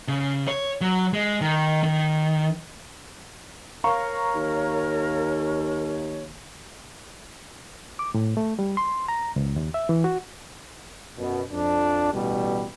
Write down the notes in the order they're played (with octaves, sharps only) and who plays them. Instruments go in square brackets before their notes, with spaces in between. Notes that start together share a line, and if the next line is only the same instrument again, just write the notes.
[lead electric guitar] C#3
C#5
F#3
G#3
D#3
D#3
[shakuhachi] A#4 [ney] C#5 [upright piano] F5 A#5 C#6
[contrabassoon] D#2
[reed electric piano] D6
A2
A3
G3
C6
A#5
C#2
D#2
E5
E3
F#4
[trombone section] F#2 B2
F2 D4
A1 B2 G3